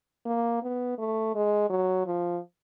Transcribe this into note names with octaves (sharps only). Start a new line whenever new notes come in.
A#3
B3
A3
G#3
F#3
F3